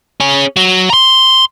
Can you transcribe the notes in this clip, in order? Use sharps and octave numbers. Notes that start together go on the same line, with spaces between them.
C#4 G#4
F#3
A#5 C6